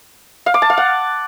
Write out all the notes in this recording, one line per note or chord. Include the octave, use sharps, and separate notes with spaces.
F5
D6
A5
F5
F#5